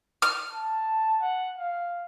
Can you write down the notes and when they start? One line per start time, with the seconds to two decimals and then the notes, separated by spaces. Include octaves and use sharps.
0.22 F6
0.53 A5
1.21 F#5
1.58 F5